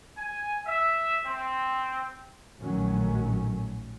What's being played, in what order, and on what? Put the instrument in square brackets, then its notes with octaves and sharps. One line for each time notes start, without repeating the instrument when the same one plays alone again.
[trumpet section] G#5
E5
C4
[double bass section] A#1 A2 D#3 F#3 A3 C#4